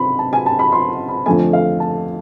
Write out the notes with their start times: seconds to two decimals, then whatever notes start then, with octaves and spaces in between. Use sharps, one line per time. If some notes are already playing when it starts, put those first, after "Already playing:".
Already playing: C3 B5 C6
0.19 A5
0.33 G#5
0.46 A5
0.59 B5
0.72 C6
1.09 B5
1.26 F2 D3 F3 A3 G#5
1.53 F5
1.80 A5